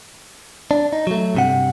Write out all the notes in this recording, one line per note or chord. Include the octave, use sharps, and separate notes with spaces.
D4
D#4
F#3 A3
G2 C3 F#5